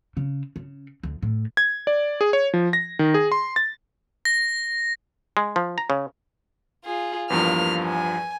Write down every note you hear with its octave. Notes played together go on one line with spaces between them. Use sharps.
C#3
C#3
D2
A2
G#6
D5
G#4
C#5
F3
A#6
D#3
G#4
C6
A6
A#6
G#3
F3
A#5
C#3
F4 G#4
E2 G2 F3 A#3 F6
G#5